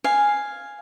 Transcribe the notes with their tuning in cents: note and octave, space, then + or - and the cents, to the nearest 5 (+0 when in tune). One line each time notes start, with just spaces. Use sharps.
F5 +0 G#5 +0